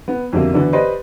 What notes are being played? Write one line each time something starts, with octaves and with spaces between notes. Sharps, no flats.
B3
F2 B2 D3 G3 A#3 E4
D3 E3 F#3 B3 D4
G4 B4 C5 D5 D#5 C6